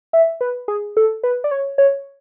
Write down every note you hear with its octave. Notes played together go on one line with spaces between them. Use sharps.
E5
B4
G#4
A4
B4
D5
C#5
C#5